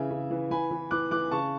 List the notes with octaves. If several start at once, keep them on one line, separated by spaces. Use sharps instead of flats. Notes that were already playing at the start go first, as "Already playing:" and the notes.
Already playing: C#3 E3 E5 G#5
C#3
E3
E3 G#5 B5
E3
E3 D6 F#6
E3 D6 F#6
C#3 A5 C#6